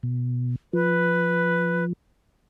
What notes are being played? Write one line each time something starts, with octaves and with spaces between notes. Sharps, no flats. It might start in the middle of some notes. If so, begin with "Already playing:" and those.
B2
F3 B4